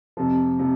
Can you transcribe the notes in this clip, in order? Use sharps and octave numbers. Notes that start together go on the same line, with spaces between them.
F2 C3 F3
C3 F3